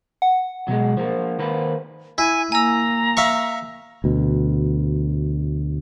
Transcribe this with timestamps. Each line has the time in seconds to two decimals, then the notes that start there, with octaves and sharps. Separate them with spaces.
0.22 F#5
0.68 B2 F#3 G#3
0.97 F3 A#3 C5
1.39 D#3 A#3 B4
2.18 E4 G#5
2.52 A#3 G#5 A#5 E6
3.17 E5 F5 C#6
4.04 D2 B2